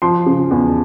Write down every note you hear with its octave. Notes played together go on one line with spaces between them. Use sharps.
F3 C6
C#3
E2